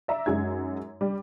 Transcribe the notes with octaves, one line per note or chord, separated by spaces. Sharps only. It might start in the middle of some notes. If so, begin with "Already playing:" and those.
D5 E5 A#5
F#2 G#3 D#4 G#6
G3